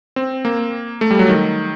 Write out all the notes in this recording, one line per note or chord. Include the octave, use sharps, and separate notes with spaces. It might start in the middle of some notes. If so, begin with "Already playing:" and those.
C4
A#3
A3
G3
F#3
D#3